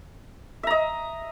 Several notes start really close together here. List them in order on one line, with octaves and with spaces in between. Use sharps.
E5 A#5 D#5